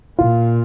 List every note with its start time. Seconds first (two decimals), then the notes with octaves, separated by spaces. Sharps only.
0.19 A#2 F4